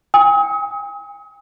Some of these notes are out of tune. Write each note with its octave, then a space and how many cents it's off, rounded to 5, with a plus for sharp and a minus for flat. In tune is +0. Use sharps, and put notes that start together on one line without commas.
G#5 -45 D#6 +40